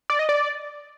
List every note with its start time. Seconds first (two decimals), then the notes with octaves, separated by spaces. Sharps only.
0.10 D5
0.19 D#5
0.29 D5